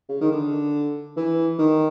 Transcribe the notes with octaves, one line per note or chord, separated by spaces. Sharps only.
C#3
D#3
D3
E3
D#3